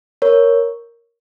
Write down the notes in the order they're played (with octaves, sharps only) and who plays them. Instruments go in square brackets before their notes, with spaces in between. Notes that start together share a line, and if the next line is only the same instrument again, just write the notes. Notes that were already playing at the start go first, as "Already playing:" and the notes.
[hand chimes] A#4 C#5